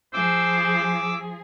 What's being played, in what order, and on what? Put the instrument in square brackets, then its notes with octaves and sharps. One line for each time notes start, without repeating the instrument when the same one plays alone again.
[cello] F3 G#4 [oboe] C5 [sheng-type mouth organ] D6 E6